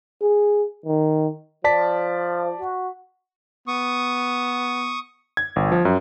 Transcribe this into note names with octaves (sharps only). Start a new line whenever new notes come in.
G#4
D#3
F3 D5 A5 B6
F#4
B3 C#6 D#6
G#6
G1
F3
F#2